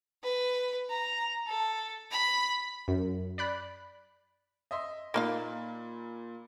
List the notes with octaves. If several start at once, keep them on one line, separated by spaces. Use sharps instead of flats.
B4
A#5
A4
B5
F#2
D5 B5 F#6
D#5 E5 C6
A#2 A#3 D#4 F5 B5 F6